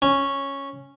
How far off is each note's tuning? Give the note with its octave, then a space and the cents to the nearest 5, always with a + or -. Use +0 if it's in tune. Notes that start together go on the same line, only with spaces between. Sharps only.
C#4 -5